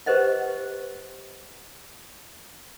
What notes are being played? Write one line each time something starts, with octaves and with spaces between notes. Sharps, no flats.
G4 B4 C5 D#5 F#5